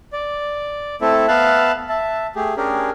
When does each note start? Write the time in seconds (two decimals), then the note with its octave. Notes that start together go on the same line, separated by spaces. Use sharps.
0.13 D5
1.01 A3 C4 E4 A4 E5
1.28 B3 E5 F5 A5 E6 F#6
1.89 E5 A5
2.36 A3 G4 G#4
2.57 C#4 D4 G4 G#4 A#4